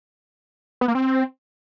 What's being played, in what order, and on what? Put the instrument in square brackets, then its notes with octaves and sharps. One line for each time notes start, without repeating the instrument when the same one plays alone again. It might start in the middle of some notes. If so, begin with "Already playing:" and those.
[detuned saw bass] B3
A#3
C4